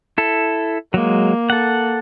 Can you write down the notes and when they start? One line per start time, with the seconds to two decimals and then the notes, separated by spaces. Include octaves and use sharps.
0.18 E4 A4
0.94 F#3 G#3 A#3
1.50 A4 F#5